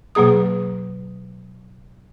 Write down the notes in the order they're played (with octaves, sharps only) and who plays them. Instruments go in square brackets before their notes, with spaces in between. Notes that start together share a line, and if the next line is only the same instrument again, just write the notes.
[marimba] B2 F#3 A#3 G#4 D#6